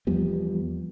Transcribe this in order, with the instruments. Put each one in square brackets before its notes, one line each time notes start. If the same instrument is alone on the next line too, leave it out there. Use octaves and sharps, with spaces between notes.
[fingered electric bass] E2 F3 G3 B3